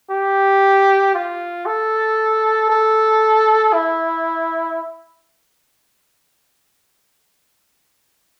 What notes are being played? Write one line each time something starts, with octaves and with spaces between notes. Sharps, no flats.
G4
F4
A4
A4
E4